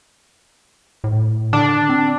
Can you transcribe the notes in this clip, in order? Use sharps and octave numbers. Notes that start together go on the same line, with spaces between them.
A2
D3 D4
C4